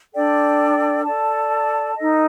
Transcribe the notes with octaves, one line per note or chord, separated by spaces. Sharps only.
D4 A4 D5 G5
A4 D5 A5
D#4 A4 D#5